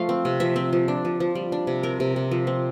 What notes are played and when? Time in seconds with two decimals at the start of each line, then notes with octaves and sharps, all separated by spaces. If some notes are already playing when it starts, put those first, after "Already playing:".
Already playing: F3 A3 F5 A5
0.09 C4
0.25 C3
0.40 F3 E5
0.56 C4
0.73 F3
0.88 D4
1.05 F3
1.20 F3
1.35 G3
1.52 D4
1.67 C3
1.83 C4 A#4
2.00 C3
2.16 C3
2.31 F3
2.47 C4